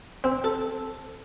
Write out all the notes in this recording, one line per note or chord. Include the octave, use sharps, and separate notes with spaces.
C4
A4